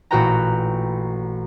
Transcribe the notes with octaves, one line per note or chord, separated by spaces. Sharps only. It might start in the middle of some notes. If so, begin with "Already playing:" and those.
A1 A#2 F#4 B4 G5 A#5